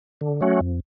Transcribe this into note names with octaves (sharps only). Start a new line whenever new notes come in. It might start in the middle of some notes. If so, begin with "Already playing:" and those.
D3
F#3 A3 C#4 F#4
F2